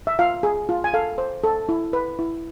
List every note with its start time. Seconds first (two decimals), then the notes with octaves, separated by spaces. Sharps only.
0.07 E5
0.19 F4 F5
0.43 G#4
0.69 F4
0.84 G#5
0.94 A4 F5
1.18 C5
1.44 A4
1.69 E4
1.93 B4
2.19 E4